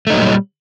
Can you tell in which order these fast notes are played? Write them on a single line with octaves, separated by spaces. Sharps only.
A3 D#4 F#3 A#2 G3